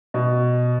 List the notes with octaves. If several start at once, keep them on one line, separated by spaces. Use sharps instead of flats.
B2